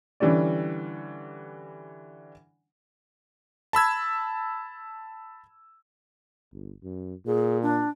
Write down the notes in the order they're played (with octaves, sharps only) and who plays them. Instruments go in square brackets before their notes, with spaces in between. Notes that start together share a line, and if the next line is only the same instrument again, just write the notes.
[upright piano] D3 E3 G3 C#4 D5
[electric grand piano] A5 B5 E6 G#6
[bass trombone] G1
F#2
[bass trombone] A#2 [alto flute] G#4
[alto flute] D4